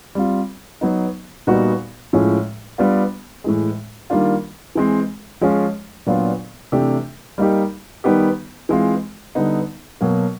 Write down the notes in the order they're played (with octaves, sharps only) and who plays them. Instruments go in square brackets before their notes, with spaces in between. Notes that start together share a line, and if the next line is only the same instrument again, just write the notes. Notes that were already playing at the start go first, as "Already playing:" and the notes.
[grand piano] G3 C4 F4
F#3 B3 D#4
A#2 G3 B3 D#4 F#4
A2 F3 G#3 C#4
G3 B3 D4 F4
A2 E3 G#3
D#3 G3 A#3 D4 F4
E3 G#3 C4
F3 G#3 C#4 F4
A#2 F#3 B3 D4 F4
C3 E3 A3 D4 G4
G3 A#3 D#4 G4
D#3 G3 B3 D#4 G4
E3 G#3 C4 F4
D3 G3 B3 D#4
B2 F#3 A#3